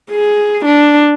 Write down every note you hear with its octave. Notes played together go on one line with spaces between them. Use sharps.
G#4
D4